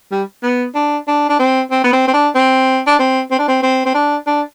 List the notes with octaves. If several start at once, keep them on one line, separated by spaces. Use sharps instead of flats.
G3
B3
D4
D4
D4
C4
C4
B3
C4
C4
D4
C4
D4
C4
C4
D4
C4
C4
C4
D4
D4